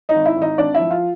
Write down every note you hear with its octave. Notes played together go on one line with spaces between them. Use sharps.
D#4 D#5
G#1
E4 E5
G#1
D#4 D#5
G#1 D4 D5
E4 E5
F3
F4 F5